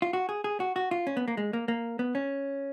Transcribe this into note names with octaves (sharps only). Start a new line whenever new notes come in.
F4
F#4
G#4
G#4
F#4
F#4
F4
C#4
B3
A#3
G#3
A#3
A#3
B3
C#4